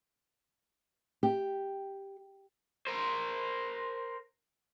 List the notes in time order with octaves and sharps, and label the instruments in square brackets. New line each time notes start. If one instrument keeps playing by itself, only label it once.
[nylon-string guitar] G4
[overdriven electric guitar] A#4 C5